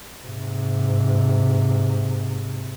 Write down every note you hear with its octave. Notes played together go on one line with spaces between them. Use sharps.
G#2 C3